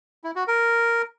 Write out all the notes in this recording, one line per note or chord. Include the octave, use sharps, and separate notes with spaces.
E4
F#4
A#4